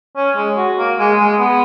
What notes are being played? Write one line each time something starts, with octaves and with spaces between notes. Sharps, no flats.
C#4
G#3
F#4
A#3
G#3
G#3
B3